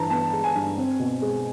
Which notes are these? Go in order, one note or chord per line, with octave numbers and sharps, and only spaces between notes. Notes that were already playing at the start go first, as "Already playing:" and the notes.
Already playing: G2 E3 A5 A#5
B3 A5
G#3
G#5
G2
C4
B2
G#3